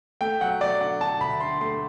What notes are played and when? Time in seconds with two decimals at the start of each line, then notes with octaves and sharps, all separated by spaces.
0.21 A3 G5
0.41 F#3 F#5
0.61 F#3 D5
0.81 D3 F#5
1.01 D3 A5
1.20 D2 B5
1.41 D3 C6
1.61 A3 C6